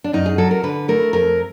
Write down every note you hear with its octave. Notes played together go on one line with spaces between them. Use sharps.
D4
F#2 D#4
G#4
F#3 A4
A#4
D3 B4
A3 A#4
F2 A#4